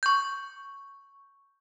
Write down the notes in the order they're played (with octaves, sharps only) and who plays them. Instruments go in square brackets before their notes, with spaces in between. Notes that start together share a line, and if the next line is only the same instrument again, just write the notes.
[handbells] C#6 G6